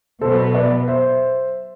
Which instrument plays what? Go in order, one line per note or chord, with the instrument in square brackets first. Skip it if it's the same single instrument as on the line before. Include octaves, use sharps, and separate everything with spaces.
[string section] B2 F#3 B3 [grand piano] A4 C5
[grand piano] B4 D5
C5 E5